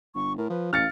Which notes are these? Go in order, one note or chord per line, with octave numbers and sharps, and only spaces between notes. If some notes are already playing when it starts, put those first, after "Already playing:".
G1 C#6
A2 A#4
F3 B4
A1 F5 F6 A6 C#7